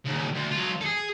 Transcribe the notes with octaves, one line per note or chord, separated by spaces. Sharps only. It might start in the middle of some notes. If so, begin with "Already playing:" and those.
D#2 C#3
D2
F#3 F4
G#4 A4